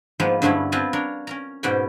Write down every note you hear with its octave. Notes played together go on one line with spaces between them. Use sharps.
G#2 F3 G#3 A#3 B3
G2 D3 A3 B3 C#4 E4
B3 C4 F4 G#5 A5
D4 A#4 C#5
C#4 A#4 A#5
G#2 B2 B3 C#4 D5 G5